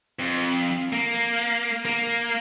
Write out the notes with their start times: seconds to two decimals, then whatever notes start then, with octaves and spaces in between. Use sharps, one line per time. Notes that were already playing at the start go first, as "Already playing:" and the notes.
0.19 F2
0.93 A#3
1.85 A#3